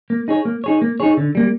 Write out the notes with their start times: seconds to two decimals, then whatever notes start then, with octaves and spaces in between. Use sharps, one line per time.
0.10 A#3
0.28 D#4 G#4 C#5
0.45 A#3
0.64 D#4 G#4 C#5
0.82 A#3
1.00 D#4 G#4 C#5
1.17 D3
1.35 G3 A#3